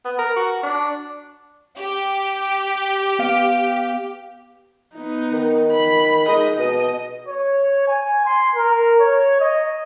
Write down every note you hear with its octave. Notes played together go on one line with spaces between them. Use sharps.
B3
A#4
F#4
D4
G4
B3 F5 D7
B3 D#4
D#3
B5
G#3 D#4 D#5
B2 D#5
C#5
G#5
C6
A#4
C#5
D#5